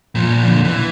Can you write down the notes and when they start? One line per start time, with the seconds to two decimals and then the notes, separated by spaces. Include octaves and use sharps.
0.15 A#2 F3
0.44 A#2 D3
0.64 E3